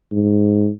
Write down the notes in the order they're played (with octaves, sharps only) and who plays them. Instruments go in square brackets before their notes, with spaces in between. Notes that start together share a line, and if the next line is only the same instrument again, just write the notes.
[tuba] G#2